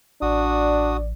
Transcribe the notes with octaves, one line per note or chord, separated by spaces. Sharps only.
A1 D4 F#4 D5 D#6